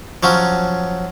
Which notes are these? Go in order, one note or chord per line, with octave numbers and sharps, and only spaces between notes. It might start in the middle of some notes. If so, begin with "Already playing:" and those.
F3 F#3 C#4